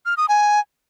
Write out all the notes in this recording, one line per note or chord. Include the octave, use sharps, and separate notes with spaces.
F6
D#6
G#5